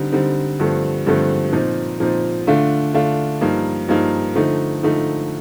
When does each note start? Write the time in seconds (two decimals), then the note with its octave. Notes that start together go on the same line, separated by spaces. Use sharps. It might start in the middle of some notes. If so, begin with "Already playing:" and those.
Already playing: D3 G3 C4 D#4
0.12 D3 G3 C4 D#4
0.60 G2 D3 F3 A3 C4
1.06 G2 D3 F3 A3 C4
1.52 A#2 F3 C4 D#4
2.00 A#2 F3 C4 D#4
2.47 D3 A3 D4 F4
2.94 D3 A3 D4 F4
3.41 G2 F3 A#3 D#4
3.89 G2 F3 A#3 D#4
4.36 D3 F3 A3 D#4
4.83 D3 F3 A3 D#4